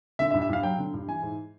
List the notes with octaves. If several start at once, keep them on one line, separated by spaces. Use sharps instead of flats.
D3 E5
E5
G2
E5
G2 F5
F#3 G5
D3
G2
E3 G#5
G#2